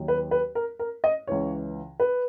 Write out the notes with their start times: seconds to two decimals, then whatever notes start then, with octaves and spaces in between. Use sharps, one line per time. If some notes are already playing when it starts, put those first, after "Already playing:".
Already playing: D#2 D#3 F#3
0.08 B4
0.31 B4
0.55 A#4
0.79 A#4
1.04 D#5
1.27 C#2 C#3 E3 C#5
2.00 B4